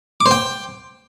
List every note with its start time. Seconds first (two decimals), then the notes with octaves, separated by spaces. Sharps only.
0.21 D6
0.26 C5
0.31 G5